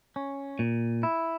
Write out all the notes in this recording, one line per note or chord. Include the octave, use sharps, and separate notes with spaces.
C#4
A#2
E4